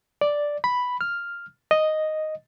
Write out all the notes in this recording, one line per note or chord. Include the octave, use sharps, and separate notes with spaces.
D5
B5
F6
D#5